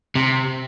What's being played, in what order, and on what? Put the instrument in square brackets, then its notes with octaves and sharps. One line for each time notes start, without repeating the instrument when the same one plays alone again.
[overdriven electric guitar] C3